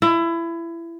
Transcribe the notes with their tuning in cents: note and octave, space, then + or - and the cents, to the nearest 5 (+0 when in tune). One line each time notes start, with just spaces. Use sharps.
E4 +25